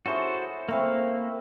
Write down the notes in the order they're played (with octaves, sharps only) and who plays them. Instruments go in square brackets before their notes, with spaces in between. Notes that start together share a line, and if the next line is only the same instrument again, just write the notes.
[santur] C#4 E4 G#4 [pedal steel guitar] F#4 A4 C5
[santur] A3 C4 B4 [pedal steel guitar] A#3 F5